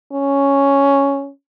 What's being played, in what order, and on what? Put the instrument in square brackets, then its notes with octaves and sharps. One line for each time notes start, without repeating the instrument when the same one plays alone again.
[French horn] C#4